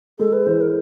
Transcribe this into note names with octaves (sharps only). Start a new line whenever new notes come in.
G#3 A4
B4
E3 C5
A#4